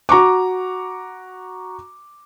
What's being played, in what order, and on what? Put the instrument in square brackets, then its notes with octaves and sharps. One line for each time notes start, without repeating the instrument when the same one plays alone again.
[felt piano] F#4 A#5 C#6 D6